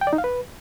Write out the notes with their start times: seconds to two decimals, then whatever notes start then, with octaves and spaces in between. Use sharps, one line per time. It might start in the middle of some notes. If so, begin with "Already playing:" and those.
0.01 G5
0.07 D5
0.13 D#4
0.18 F5
0.24 B4